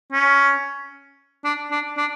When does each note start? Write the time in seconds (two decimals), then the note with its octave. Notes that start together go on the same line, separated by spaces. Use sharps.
0.12 C#4
1.44 D4
1.71 D4
1.98 D4